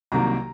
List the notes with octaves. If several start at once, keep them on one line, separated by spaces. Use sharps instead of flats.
C2 C3 D#3 F#3 A#3 A#5